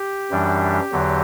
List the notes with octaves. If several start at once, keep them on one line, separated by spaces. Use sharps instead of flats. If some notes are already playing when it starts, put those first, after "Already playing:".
Already playing: G4
F#2 E3 G3 D4
E2 D3 F#3